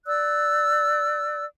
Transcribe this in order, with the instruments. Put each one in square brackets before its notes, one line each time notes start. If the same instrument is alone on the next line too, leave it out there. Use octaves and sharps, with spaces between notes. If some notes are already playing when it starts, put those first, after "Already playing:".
[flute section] D5 E6 F#6